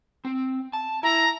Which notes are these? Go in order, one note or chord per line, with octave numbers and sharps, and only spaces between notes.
C4
A5
E4 A#5